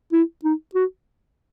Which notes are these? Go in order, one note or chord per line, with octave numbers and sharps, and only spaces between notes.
E4
D#4
F#4